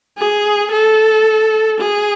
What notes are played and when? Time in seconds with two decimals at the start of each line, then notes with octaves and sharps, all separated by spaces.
0.18 G#4
0.72 A4
1.81 G#4